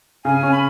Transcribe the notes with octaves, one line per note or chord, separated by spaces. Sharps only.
C#3 G#5
C#4
B5